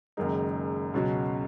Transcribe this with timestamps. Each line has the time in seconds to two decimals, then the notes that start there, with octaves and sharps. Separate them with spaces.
0.17 F#1 F#2 D#3 G#3 D#4
0.94 C#2 B2 F#3 C#4 F#4